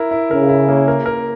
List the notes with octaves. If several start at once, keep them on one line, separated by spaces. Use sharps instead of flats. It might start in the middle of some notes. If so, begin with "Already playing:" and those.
Already playing: E4 A#4
E4
C#3 A#4
E4
A#3
A#4
A#4